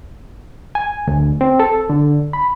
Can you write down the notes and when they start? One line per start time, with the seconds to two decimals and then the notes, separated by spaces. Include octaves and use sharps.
0.75 G#5
1.07 D2
1.41 C4
1.60 A4
1.90 D3
2.33 B5